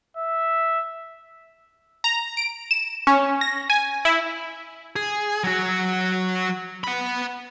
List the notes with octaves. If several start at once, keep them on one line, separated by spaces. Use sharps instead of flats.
E5
A#5
D7
E7
C#4
A#6
G#5
E4
G#4
F#3 F#4
F#5 B5